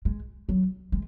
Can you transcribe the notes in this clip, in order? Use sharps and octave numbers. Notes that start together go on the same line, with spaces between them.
G#3
F#3
G#3